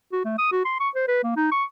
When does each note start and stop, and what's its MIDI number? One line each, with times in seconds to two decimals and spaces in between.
0.13 0.20 66
0.25 0.34 57
0.38 0.47 87
0.52 0.62 66
0.65 0.76 84
0.80 0.89 85
0.95 1.08 72
1.08 1.22 71
1.23 1.34 58
1.36 1.50 63
1.51 1.64 85